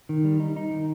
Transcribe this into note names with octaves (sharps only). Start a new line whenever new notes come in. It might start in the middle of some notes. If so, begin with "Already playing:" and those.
D#3
G3
D#4
D#4
D#3